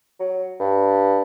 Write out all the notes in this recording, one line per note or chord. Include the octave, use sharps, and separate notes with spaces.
F#3
G2